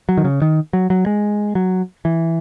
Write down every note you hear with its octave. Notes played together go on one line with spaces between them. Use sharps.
F#3
D#3
C#3
D#3
F#3
F#3
G#3
F#3
E3